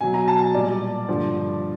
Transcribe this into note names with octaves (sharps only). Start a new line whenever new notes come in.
B2 F#3 G#5
A#5
A5
G#5
A#2 G3 D5
G2 D3 F3